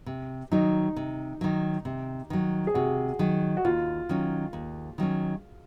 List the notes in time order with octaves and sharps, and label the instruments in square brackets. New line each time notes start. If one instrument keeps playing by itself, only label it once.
[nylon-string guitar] C3
[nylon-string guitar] D#3 F#3 [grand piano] D#4
[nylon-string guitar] C3
D#3 F#3
C3
D#3 F#3
[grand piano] G#4
[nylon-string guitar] C3 [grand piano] F#4
[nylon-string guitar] D#3 F#3
[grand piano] F#4
[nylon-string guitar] D#2 [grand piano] F4
[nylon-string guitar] D#3 F#3 C#4
D#2
D#3 F#3 C#4